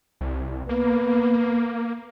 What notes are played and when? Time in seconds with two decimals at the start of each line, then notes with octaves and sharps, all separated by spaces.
0.21 C2
0.69 A#3 B3